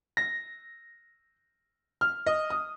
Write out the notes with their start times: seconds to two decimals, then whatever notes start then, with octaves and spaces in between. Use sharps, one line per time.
0.17 A#6
2.01 F6
2.26 D#5
2.50 D#6